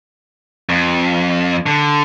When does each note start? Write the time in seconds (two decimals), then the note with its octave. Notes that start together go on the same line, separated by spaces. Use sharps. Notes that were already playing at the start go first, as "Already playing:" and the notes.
0.70 F2
1.66 D3